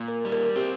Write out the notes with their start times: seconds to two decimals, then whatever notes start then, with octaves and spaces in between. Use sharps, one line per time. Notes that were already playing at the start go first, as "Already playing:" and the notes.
Already playing: A#2
0.08 A#4
0.25 G3
0.32 A#4
0.56 C4 G4